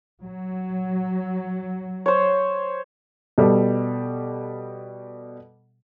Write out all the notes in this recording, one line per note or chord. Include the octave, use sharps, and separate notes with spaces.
F#3
C5 C#5
B2 G3 A4